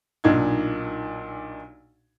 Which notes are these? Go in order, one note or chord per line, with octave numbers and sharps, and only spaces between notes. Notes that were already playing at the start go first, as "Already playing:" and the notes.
B1 A#2 D4 D#4 G#6